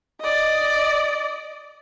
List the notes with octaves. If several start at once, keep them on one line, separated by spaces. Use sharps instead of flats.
D5 D#5